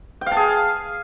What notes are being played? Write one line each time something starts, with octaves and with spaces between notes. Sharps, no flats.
G5
F5
A5
G#4